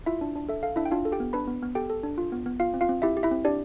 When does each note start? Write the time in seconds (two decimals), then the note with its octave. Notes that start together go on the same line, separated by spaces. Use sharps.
0.06 E4 F4 E5
0.21 D4
0.35 D4
0.49 A4 E5
0.63 A4 F5
0.76 D4 E4 E5
0.85 G5
0.91 D4 F4 F5
1.05 A4
1.12 G4 G5
1.20 B3
1.33 D4 B4 B5
1.47 B3
1.62 B3
1.75 G4 A4 G5
1.90 A4
2.03 D4
2.18 F4
2.32 B3
2.46 B3
2.60 F4 F5
2.74 C4
2.81 F4 F5
2.89 C4
3.02 E4 G4 E5
3.17 G4
3.23 E4 E5
3.31 C4
3.45 D4 G4 D5